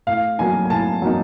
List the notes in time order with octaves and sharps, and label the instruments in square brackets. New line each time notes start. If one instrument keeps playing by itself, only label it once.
[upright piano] A2 F5
F#3 A#3 D#4 G#5
G#5
A2 A5
F#3 A#3 D#4